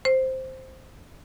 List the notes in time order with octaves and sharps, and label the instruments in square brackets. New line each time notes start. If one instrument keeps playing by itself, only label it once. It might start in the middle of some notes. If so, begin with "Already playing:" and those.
[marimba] C5